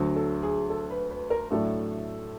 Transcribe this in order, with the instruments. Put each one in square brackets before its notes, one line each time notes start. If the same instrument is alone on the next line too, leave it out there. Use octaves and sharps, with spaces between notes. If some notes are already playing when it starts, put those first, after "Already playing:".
Already playing: [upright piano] D2 D3 F#3
[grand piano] A4
G#4
A4
B4
B4
A#4
[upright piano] A2 F#3 A3 D4 [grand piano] A4